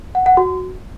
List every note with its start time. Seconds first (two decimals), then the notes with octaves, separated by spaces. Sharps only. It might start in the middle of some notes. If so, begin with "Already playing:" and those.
0.15 F#5
0.26 F#5
0.37 F#4